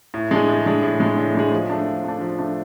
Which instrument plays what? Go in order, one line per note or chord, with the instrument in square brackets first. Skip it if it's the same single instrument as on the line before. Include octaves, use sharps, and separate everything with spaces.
[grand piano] A2
G#3 D4 G#4
A2
G#3 D4 G#4
A2
G#3 D4 G#4
A2
G#3 D4 G#4
F3
A3 D4
F3
A3 D4
F3
A3 D4